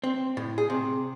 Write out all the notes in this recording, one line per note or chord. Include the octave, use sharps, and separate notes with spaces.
C4
A2
G#4
C3